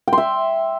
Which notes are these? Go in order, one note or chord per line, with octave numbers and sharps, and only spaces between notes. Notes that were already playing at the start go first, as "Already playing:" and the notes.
G5
C6
E5